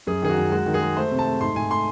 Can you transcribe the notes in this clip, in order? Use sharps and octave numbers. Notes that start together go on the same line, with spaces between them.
F#2 G#4
D#3 G#4
F#4
F#2
G#3 F#4
D#3
G#4
G#3
A3 C5
C3
A5
A3
G#2 C6
G#2 G#5
A3 C6